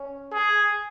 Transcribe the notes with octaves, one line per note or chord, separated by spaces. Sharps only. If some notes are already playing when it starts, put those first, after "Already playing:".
Already playing: C#4
G#4